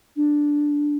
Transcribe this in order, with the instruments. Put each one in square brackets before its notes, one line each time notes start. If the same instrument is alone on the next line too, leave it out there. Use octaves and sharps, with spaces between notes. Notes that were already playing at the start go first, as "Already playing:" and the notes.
[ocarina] D4